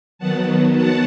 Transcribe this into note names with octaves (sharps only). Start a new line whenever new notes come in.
D#3 F#3 B3 F#5 A5
F#5 A5